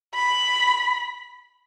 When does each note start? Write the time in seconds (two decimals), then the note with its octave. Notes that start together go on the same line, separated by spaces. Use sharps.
0.15 B5